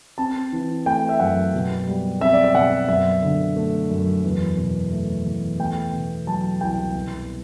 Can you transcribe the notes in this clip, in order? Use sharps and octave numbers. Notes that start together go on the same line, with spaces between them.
C4 A5
E3
A3 G5
E5
F#2 F#5
B2
G3
C4 E5
D5
E5
B2 F#5
F#2 E5
D3
A3
F#2
E2
B2
A3
E2
A3 G5
B2
F#3 A5
C2 G5
B2